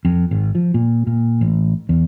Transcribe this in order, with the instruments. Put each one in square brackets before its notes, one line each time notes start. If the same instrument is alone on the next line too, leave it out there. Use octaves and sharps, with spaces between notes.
[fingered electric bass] F2
G#1
F3
A#2
A#2
A1
E2